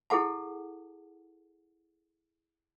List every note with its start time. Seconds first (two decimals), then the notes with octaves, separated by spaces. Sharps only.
0.10 E4 G#4 A4 F#5 A5